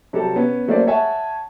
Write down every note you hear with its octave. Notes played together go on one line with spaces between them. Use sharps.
C3 F#3 G3 G4 A4
B3 C#4
F#3 A3 A#3 C#4 C5 D5
C#5 E5 F#5 G#5 A5